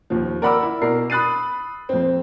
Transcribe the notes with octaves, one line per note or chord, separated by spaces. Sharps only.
D#2 F3
A#4 D5 F#5 B5 D6 E6
E4
B2 A#4 D5 C7
B5 D#6 F#6 A6 C7 D#7
F2 C4